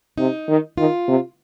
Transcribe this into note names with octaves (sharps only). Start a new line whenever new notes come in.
C3 D#4
D#3
D#3 F4
C3